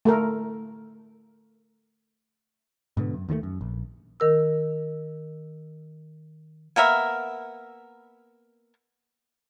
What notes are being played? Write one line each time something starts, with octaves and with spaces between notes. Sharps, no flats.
A3 A4 A#4
G#2 B2 D3 B3
F#2
D#2 D#3 F3 A3
F#2
A#1
D#3 A#4 E6
A#3 B3 A#4 E5